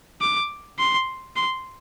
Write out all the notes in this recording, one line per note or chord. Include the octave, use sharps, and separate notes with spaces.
D6
C6
C6